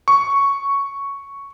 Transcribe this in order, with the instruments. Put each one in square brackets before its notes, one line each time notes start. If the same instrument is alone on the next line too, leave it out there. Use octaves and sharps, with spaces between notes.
[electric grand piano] C#6